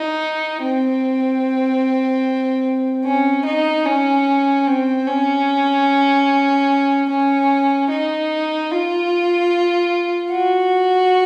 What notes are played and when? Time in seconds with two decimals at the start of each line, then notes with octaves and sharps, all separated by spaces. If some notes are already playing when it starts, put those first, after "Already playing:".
Already playing: D#4
0.62 C4
3.05 C#4
3.45 D#4
3.86 C#4
4.67 C4
5.07 C#4
7.10 C#4
7.90 D#4
8.71 F4
10.33 F#4